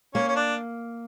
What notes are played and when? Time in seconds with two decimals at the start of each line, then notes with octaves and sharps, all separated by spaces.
0.14 A#3 C#4
0.28 C#4
0.36 D4